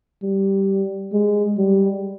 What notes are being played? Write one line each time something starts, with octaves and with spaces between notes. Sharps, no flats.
G3
G#3
G3